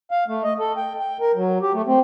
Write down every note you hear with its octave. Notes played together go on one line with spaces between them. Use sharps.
F5
A3
D#5
A4
G5
G5
A#4
F#3
G4
A3
C4